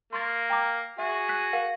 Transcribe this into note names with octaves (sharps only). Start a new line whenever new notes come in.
A#3 C6 C#6 A6
G5 A#5 D6
F#4 G#4 E5
F#6 B6 D#7
A#4 F5 F#5